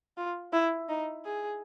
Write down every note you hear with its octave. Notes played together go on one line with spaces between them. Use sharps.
F4
E4
D#4
G#4